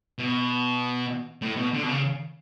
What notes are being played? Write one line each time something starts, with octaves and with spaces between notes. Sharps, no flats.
B2
A2
B2
D3
B2
C#3